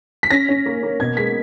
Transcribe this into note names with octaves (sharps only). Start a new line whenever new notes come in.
B6
C#4 A#6
C#4
A#3
A#3
B2 G#6
G#3 B6